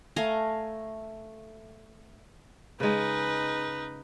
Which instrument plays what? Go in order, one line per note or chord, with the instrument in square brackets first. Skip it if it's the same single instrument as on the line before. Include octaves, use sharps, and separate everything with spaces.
[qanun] A3 F5 G#5 A#5
[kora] C#3 G#3 [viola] D#4 B4